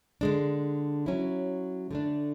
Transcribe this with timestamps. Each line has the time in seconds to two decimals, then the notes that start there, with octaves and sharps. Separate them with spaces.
0.21 D3 G#3 D4
1.06 F#3 C#4 E4
1.91 D3 A3 D4